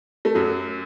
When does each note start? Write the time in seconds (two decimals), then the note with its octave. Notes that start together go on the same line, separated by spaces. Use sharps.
0.25 A3
0.35 F#2 F#3